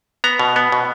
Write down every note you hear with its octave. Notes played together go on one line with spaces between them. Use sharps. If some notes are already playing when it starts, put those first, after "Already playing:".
B3 A#5
B2
B3
B2